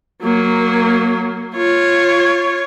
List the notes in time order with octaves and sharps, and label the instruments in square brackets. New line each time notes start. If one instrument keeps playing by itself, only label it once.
[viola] F#3 A#3
F4 C#5